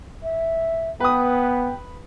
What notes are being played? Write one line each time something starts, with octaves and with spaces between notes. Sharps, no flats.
E5
B3 B4 G5 D#6